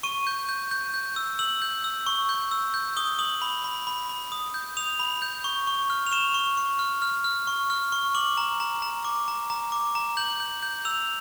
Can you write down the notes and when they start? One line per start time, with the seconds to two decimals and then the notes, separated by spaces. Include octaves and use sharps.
0.03 C#6 D#7
0.27 G6
0.49 G6
0.71 G6
0.94 G6
1.16 E6
1.39 E6 F#7
1.62 G6
1.84 E6
2.07 C#6
2.29 G6
2.51 E6
2.74 G6
2.97 D#6 G7
3.19 D#6 F#7
3.42 B5
3.64 B5
3.87 B5
4.09 B5
4.32 D#6
4.54 G6
4.77 D#6 F7
4.99 B5
5.22 G6
5.44 C#6
5.67 C#6
5.90 F6
6.07 F7
6.12 C#6 E7
6.34 C#6
6.57 C#6
6.79 F6
7.02 F6
7.24 F6
7.47 C#6
7.70 F6
7.92 C#6
8.15 D6 F#7
8.37 A#5
8.60 A#5
8.82 A#5
9.05 D6
9.28 A#5
9.50 A#5
9.72 D6
9.95 A#5
10.17 G6 F#7
10.40 G6
10.63 G6
10.85 E6 F7